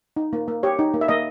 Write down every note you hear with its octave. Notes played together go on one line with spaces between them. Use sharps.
D#4
A#3
A#3
G4 C#5
D#4
A#3
E5
A#3 D#5